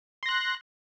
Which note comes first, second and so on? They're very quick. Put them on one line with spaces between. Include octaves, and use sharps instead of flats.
C6 A#6 F#6